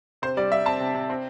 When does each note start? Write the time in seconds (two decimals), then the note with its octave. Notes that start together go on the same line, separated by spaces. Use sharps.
0.22 C3 C5
0.37 G3 D5
0.51 G3 E5
0.66 C4 A5
0.80 C3
0.95 C3
1.10 C4